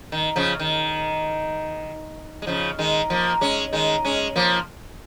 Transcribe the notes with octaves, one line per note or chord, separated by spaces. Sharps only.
D#3
C#3 F3
D#3
G#3
C#3 F3
D#3 G#3
F3 A#3
G#3 C#4
D#3 G#3
G#3 C#4
F3 A#3